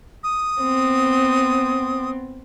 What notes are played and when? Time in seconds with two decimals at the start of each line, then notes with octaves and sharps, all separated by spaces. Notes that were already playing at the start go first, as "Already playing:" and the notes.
0.24 D#6
0.60 B3 C4